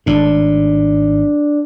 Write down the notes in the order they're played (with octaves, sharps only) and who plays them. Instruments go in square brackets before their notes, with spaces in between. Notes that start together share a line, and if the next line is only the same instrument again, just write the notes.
[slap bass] G#1 A2 [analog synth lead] D4